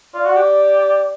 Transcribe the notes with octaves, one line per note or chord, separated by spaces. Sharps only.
F4 D5
F#4
G4